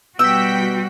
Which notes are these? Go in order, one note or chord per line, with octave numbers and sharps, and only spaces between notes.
B2 G3 F#4 G5 E6 B6